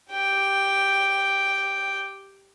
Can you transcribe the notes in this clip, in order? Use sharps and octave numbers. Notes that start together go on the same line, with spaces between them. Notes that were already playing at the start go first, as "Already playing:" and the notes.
G4 G5